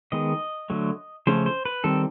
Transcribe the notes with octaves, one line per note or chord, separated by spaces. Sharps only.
D#3 G#3 B3 D#5
D3 F#3 A3
C#3 F3 A3 C#4 C5
C5
B4
D#3 G3 C4 A4